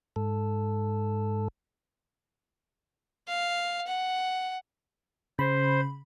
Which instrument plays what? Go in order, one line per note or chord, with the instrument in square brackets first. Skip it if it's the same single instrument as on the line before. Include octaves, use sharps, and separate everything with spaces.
[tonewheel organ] G#2 A4
[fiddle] F5
F#5
[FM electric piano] C#3 B5 [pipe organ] C5